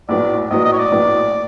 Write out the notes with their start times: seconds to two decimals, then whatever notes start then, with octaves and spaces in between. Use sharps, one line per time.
0.09 A#1 A2 F#3 B3 D5
0.51 A#1 A2 F#3 B3 D#5
0.64 D#5
0.73 C#5
0.78 D5
0.92 A#1 A2 F#3 B3